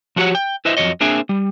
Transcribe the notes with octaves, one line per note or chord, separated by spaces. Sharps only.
F3 D4 F#4 G4 C#5 F#5
G5
E4 B4 C5 D#5 E5
F2 D#3 F#3 C#5 D#5
A#3 C4 D4 G#4 E5 G#5
G3